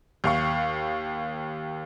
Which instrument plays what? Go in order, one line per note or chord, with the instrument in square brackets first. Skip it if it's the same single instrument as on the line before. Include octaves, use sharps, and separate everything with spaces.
[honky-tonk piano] D#2 F5 C#6